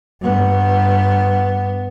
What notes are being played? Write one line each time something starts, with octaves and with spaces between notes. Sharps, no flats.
G2 B3